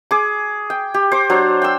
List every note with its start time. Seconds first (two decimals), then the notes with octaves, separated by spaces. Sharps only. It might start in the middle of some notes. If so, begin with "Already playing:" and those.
0.11 G#4 D6
0.70 G5
0.94 G4
1.12 C5 D6
1.29 F#3 D4 C5 C#5
1.62 G5 E6